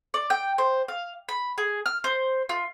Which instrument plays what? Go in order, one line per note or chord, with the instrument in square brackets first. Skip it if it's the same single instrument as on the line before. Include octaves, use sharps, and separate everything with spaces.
[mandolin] D5
G5
C5
F5
B5
G#4
F6
C5
F4